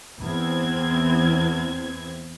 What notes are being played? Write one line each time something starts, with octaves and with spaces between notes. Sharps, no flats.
E2 C4 G#6